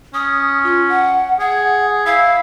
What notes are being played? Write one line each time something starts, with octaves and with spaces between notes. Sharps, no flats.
C#4 D#6
F4
F#5
G#4 F#5
E4 F5